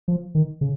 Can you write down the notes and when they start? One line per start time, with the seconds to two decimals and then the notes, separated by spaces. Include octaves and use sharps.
0.08 F3
0.35 D#3
0.61 C#3